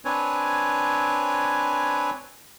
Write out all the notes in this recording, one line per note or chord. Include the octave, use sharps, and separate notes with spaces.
C4 D4 B4 C#5 G#5